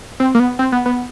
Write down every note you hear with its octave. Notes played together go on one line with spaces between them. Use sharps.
C4
A#3
B3
C4
B3
B3